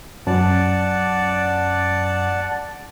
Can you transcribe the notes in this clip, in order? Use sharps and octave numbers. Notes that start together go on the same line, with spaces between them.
F#2 D5 F#5 A5